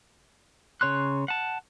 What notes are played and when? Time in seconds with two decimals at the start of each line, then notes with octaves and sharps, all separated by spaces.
0.81 C#3 C#5 C6 F#6
1.28 F#5 A5